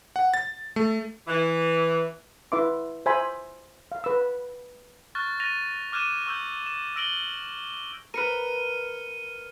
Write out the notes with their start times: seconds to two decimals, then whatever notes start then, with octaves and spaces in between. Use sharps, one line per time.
0.16 F#5
0.34 A6
0.76 A3
1.28 E3
2.52 E4 B4 E5 C6 D6
3.06 C5 E5 G#5 B5
3.92 F5
4.04 B4 E6
5.15 C#6 F6 F#6 A6
5.40 F#6 A6 A#6 D#7 F7
5.92 D6 F6 F#6 G#6 D#7 E7
6.26 C#6 E6 G6
6.66 E7
6.96 E6 A#6 D7 F#7 G7
8.14 A#4 B4 F6 C#7 D#7